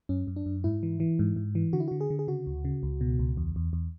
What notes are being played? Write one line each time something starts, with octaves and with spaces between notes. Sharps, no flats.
F#2 C#4
F#2
D4
F#2
G#2 E4
E3
E3
G#2
G#2
E3
D3 F#4
E4
D3 F#4
G#4
D3
G#4
C#3 F#4
D2
C#3
C#2
B2
C#2
E2
E2
E2